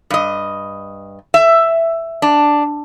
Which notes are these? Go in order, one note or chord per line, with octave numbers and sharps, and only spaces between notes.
G2 D#5
E5
D4